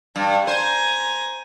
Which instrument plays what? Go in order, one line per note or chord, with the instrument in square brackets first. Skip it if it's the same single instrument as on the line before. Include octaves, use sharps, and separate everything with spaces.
[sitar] G2 [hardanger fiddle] D4
[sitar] C5 [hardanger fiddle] G#5 A#5